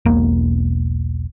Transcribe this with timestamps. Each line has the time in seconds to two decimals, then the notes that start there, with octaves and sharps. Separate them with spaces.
0.05 E1 B1 A#3